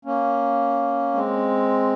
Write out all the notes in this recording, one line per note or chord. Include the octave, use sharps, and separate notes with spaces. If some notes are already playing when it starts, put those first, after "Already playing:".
A#3 C#4
G#3 C4